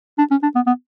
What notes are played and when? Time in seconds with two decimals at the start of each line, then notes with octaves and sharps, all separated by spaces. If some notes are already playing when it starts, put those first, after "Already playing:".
0.18 D4
0.31 C#4
0.42 D4
0.55 B3
0.67 B3